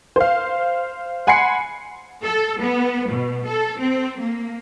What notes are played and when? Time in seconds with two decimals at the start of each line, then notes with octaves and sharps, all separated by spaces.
0.16 C5 F5
1.27 F#5 G#5 B5 C6 C7 C#7
2.24 A4
2.62 B3
3.11 B2
3.47 A4
3.80 C4
4.20 A#3